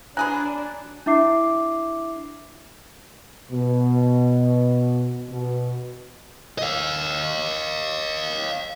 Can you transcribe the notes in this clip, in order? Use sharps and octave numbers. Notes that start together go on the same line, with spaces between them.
F#3 D4 G#4 B4 G#5 A#5 F#6
D4 E4 E5 D6 C7
B2
B2
D#5 F5